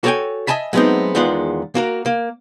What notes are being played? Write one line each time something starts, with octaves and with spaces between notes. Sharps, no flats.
F#4 A4 C#5 D5 G5 G#5
D#5 E5 G#5 A5 B5
F#3 G#3 A3 B3 C4 D#4
E2 D#3 G#3 B3 F4 F#5
A#3 F#4 A#4
A#3